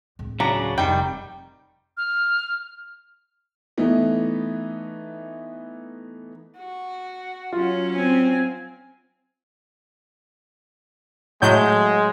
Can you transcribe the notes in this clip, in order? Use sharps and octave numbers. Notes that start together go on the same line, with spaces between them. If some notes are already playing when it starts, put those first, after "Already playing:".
D1 G#3
C#3 F#3 D4 A#5
F1 D#3 G3 G5
F6
E3 A3 B3 D#4
F#4
F#3 C#4 F4
C4 G#5
A2 F#3 G#3 G6